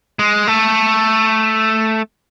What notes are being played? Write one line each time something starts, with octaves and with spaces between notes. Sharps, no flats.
G#3
A3